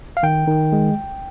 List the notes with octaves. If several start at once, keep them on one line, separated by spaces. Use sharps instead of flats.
F5
D#3 G5
D#3
G#3